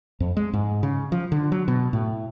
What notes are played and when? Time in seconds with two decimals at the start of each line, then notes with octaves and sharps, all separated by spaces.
0.20 F2
0.37 G#3
0.53 G#2
0.83 C#3
1.12 F3
1.32 D3
1.52 F#3
1.68 B2
1.93 A2